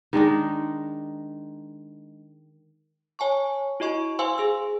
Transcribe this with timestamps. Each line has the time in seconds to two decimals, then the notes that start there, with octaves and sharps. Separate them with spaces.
0.13 D#3 G#3 D4 D#4
3.19 C#5 G#5 A5 C#6
3.80 E4 F#4 D#5 C#6
4.19 C5 F5 G#5 C6 E6
4.38 G#4 E6